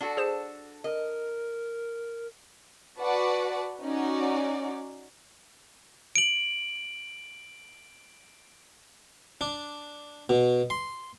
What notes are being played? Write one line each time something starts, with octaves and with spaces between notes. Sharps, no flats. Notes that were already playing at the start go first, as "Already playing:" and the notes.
D4 F#4 A4
G#4 C5 E7
A#4 D#5
F#4 B4 D5 F#5 A5
C#4 D#4 F#4 D5
D7 F#7
D4
B2
C6